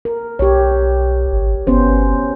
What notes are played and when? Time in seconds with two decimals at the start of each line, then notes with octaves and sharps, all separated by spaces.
0.05 A#4
0.39 B1 G4 C#5
1.32 G#1
1.67 G1 B3 C#4 C5